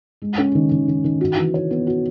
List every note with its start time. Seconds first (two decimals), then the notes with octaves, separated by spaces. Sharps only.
0.22 G#3
0.38 C#4
0.55 D#3
0.71 D#3
0.88 D#3
1.04 D#3
1.21 F#4
1.37 E3
1.54 C#5
1.71 B3
1.87 F#4